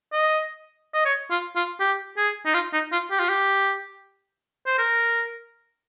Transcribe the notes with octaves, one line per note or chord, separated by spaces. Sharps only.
D#5
D#5
C#5
F4
F4
G4
G#4
D#4
F4
D#4
F4
G4
F4
G4
C5
A#4